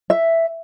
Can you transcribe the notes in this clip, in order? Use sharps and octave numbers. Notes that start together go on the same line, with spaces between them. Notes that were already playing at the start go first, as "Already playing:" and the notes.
E5